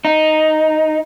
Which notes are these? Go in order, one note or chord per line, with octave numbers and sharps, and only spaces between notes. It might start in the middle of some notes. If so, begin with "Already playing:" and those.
D#4